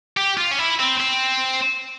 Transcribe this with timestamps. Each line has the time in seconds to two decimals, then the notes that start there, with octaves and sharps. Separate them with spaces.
0.17 G4
0.38 F4
0.51 C#4
0.59 E4
0.80 C4
1.00 C4